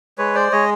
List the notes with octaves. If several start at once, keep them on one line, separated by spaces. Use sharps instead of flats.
G#3 B4 C#5
C5 D5
G#3 C#5 D#5